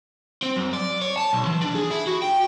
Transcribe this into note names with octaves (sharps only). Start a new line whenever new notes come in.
C4
F#2
D5
C#5
A5
B1
E3
D4
G#4
E4
F#4
G5